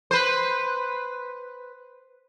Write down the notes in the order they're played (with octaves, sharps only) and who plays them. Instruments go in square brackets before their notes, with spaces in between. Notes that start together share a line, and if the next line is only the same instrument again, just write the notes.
[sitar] B4 C5